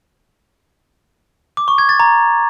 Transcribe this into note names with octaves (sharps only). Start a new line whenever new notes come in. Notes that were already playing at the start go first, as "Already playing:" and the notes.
D6
C#6
G#6
A6
A#5